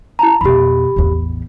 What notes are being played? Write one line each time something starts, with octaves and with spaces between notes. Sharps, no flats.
E4 A5 A#5
F2 B2 G4 B5
A1 E2